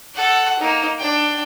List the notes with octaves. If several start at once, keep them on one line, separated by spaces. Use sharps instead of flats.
A4 F#5
A#3 D#4
D4 G5